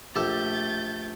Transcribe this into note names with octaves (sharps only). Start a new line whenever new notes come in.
A#1 A3 G4 A4 A5 G6 A6